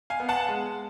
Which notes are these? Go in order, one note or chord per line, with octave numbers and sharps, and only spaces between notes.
F5 G#5
B3
F#5 A5
G#3